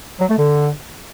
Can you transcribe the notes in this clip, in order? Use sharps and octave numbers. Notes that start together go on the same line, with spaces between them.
F#3
A3
D3